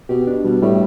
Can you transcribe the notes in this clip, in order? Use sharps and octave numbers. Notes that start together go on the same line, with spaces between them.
B2 G4
D4
B2 G3
A2 G3